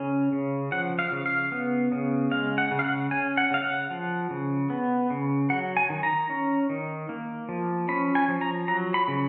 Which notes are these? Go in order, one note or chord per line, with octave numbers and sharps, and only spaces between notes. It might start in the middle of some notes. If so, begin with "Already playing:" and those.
Already playing: C#3 C#4
C#3
F3 F#5
F5
C#3
F5
B3
C#3
G#3 F5
F#5
C#3
F5
F#5
C#4 G#5
F#5
C#3 F5
F#5
F3
C#3
B3
C#3
F#3 F#5
G#5
D#3
A#5
C#4
D#3
A#3
F3
C#4 B5
G#5
F3
A#5
F#3 A#5
B5
C#3